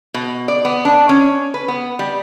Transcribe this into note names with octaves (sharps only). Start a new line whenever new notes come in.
B2
D5
B3
D4
C#4
B4
B3
G3